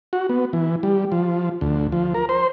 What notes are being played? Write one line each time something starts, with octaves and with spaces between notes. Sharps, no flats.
F#4
B3
E3
G3
F3
D2
F3
A#4
C5